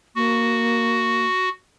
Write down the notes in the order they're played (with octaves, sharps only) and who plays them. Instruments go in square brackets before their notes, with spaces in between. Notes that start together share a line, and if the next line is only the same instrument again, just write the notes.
[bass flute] A#3 [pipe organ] F#4